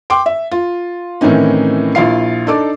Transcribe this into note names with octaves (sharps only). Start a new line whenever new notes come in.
G5 C6 D6
E5
F4
A2 D#3 E3 C4 C#4 D#4
A#1 E4 F4 F5 C7
D4 D#4 A4 D6